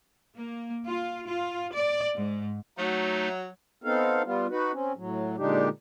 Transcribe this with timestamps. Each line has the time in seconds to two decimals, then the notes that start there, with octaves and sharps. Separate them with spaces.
0.35 A#3
0.86 F4
1.27 F4
1.73 D5
2.16 G#2
2.77 F#3 A3 D#4
3.84 B3 C4 D#4 A4 F5
4.24 G3 B3 F4
4.50 D#4 F#4 B4
4.73 C4 C#4
4.96 A2 F#3
5.38 A#2 D3 G#3 D4 D#4 G4